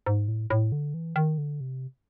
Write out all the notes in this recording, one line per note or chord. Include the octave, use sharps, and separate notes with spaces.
G#2
A2
A2
D3
E3
D#3
D3
C3